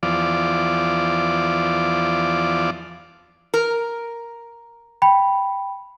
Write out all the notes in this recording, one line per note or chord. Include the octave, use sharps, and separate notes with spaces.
E2 F3 D5
A#4
G5 B5